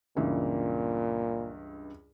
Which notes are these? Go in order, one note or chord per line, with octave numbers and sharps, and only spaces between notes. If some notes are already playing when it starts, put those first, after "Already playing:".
C#2 G2 A#2 E3